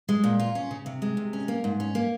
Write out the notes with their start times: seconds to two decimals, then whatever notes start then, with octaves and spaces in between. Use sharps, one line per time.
0.09 G#3
0.24 A#2
0.40 F4
0.55 C#4
0.71 C#3
0.86 C3
1.02 G#3
1.17 C3
1.33 C#4
1.48 A#3
1.64 G#2
1.80 C#4
1.95 A#3